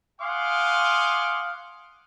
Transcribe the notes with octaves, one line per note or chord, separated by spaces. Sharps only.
F5 F#5 G#5 C6 D6 D#6